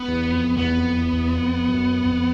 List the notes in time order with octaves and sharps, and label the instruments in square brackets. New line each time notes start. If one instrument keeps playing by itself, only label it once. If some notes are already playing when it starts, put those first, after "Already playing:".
Already playing: [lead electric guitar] B3
[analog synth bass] E2
F2
[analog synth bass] E2 [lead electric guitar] B3
[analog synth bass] F2
E2
E2
F2
F#2
F2